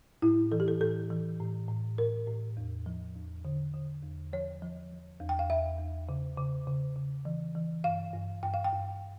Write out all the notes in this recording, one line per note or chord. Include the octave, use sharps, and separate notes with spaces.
A2 E4
E3 A4
G4
A4
A2 A4
E3
A2
A2
A2 A#4
A2
E2
F3
E2
D3
D3
E2
F3 C#5
F3
F3
E2
G5
F5
E2 E5
E2
C#3
C#3
C#3
C#3
E3
E3
G2 F5
G2
G2 G5
F5
G5
G2